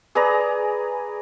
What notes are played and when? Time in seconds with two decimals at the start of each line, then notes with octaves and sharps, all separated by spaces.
0.15 G#4 B4 D5 A#5